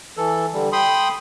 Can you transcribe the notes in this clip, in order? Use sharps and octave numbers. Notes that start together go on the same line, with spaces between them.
E3 A4
D3 G3
G5 B5 C6 D#6